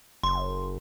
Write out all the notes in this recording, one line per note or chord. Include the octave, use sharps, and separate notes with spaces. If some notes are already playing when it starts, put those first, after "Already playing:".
F#1 C6